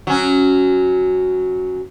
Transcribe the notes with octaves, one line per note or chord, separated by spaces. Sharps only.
F#3 C#4